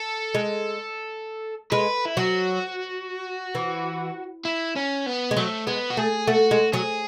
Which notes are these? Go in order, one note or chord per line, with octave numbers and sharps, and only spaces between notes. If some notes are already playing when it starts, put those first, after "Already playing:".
Already playing: A4
G#3
G#3 B4
E4
F#3 F#4
E3
E4
C#4
B3
G#3
F#3 A3
G#3 B3
F#4
A3 G#4
A3 F#4
G#3
F#3 G#4